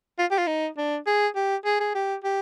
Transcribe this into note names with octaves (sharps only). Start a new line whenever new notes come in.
F4
G4
F4
D#4
D4
G#4
G4
G#4
G#4
G4
G4